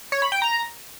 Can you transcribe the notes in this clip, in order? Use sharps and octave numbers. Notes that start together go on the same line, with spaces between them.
C#5
B5
G5
A#5